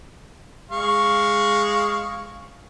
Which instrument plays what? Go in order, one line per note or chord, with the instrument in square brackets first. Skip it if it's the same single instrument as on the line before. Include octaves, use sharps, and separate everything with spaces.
[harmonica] G#3 F5 C#6